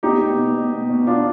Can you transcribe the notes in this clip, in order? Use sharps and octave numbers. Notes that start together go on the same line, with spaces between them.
B2 D#4 G4
B2
B2
B2
B2
B2
B2 D4 F4